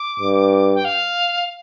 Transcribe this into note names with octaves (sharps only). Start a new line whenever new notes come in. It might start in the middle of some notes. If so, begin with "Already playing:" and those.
Already playing: D6
G2
G5
F5